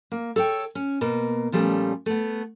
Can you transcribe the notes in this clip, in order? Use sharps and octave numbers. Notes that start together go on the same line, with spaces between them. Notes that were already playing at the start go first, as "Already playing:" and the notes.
A#3
A4 C#5 F#5 G5
C#4
B2 A#3
A#2 F3 G3 A3 C#4
A3 B3